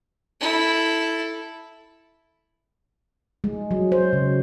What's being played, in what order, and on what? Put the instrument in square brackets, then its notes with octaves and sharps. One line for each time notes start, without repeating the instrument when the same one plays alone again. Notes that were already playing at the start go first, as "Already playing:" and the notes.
[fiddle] E4 A4
[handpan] G#3
F#3
C5
C#3